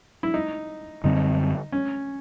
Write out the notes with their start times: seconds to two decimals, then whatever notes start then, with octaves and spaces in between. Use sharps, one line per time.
0.23 E4
0.34 D#4
1.04 F#2 D3 G3 C4 D#4
1.72 C#4